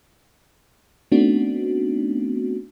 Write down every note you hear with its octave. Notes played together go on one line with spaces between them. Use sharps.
A3 B3 C4 D4 D#4 F#4